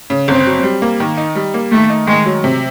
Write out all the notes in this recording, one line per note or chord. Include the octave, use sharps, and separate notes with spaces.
C#3
G1 C4
F#3
G3
A#3
D#3
D#4
G3
A#3
D#3 A3
D#4
D#3 G#3
F#3
C3